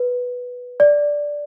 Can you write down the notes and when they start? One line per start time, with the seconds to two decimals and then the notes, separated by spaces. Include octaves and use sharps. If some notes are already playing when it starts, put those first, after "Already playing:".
Already playing: B4
0.80 D5